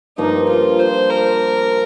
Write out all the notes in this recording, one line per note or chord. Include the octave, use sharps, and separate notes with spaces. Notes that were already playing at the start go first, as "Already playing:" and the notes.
G2 F3 A#3 D#4
F4
C5
A#4